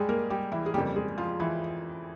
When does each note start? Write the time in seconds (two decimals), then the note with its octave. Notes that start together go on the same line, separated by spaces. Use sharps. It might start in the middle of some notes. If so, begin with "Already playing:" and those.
Already playing: G#2 G3 G#3 G4 G#4
0.09 A#3 A#4
0.30 G3 G4
0.52 E3 E4
0.66 G#4
0.74 F2 C#3 G3 A#3 G4
0.96 G#3 G#4
1.18 F3 F4
1.40 E3 E4